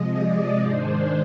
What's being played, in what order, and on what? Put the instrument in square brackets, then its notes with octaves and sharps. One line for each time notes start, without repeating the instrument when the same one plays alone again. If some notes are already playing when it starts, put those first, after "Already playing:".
Already playing: [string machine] C3 F3 G#3 D#5
D5
G#2 D#3 G#3 D4 C5